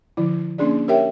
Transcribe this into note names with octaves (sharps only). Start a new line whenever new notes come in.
D3 F3 E4
A#3 C#4 D4 G#4 D5
G4 A#4 C#5 E5 G5